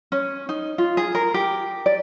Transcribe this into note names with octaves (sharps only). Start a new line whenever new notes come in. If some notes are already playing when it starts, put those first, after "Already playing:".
C#4
D#4
F4
G#4
A#4
G4
D5